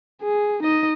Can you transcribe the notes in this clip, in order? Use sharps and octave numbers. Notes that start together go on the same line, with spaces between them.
G#4
D#4 D#5